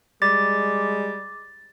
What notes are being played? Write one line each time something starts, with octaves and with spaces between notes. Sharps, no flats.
G3 G#3 D6 A6